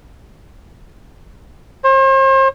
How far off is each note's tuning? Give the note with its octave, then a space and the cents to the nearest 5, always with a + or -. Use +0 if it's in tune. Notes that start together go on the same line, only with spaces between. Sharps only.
C5 +40